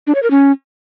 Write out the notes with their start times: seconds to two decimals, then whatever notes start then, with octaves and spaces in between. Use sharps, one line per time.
0.07 D4
0.15 C#5
0.23 A#4
0.31 C#4